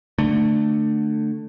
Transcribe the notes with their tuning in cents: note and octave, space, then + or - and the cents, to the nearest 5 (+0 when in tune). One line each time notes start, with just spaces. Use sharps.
D3 +20 A3 +10